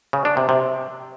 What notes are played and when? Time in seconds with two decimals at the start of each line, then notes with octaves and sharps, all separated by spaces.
0.13 C#3
0.25 D4
0.37 C3
0.49 C3